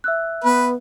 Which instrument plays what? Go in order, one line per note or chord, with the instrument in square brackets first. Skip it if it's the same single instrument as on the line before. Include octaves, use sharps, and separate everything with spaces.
[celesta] E5 E6 F#6
[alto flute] B3 [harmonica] B4